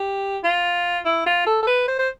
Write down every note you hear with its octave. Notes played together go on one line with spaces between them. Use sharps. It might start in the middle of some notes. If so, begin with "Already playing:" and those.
Already playing: G4
F4
E4
F4
A4
A4
B4
C5
C5